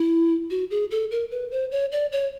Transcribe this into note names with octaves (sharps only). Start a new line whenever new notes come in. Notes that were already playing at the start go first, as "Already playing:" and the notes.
Already playing: E4
F#4
G#4
A4
A#4
B4
C5
C#5
D5
C#5